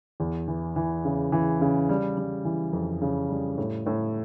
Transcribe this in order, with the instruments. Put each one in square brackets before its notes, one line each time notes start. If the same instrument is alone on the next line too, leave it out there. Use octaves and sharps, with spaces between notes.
[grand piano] E2
E3
E3
C#3
E3
C#3
G3
G3
E3
F2
C#3
G3
A2
A2